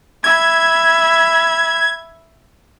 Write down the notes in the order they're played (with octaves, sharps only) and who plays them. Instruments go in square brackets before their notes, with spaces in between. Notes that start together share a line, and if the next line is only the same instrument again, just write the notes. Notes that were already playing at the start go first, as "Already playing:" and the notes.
[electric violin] E5 B5 [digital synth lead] G#6